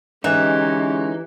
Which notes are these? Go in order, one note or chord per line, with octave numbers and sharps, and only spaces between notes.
D3 E3 G#3 C#4 D#4 G4